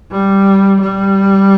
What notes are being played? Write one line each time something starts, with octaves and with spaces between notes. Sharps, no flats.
G3
G3